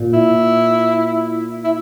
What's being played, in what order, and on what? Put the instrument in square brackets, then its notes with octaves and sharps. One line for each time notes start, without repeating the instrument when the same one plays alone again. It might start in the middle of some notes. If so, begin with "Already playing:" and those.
Already playing: [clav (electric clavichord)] A#2
[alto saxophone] E4
E4